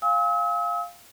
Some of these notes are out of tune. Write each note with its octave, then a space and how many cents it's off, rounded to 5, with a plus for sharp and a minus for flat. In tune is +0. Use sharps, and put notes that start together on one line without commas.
F5 +0 G#5 -45 E6 -45